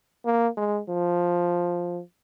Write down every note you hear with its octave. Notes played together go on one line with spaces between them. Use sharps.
A#3
G#3
F3